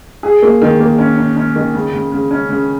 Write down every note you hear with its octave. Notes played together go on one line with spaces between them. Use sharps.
G#4
A#3
D#3
A#3
C#4
C#4
C#4
D#3
C#3
C#3
C#3
C#4
C#3